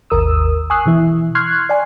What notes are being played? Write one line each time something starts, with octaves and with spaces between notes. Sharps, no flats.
G#1 D#2 A#4 D#6 E6
G#5 C#6 D#6 E6 F#6 C7
B2 E3 E4
C6 C#6 F6 F#6 G#6 C7
D5 G#5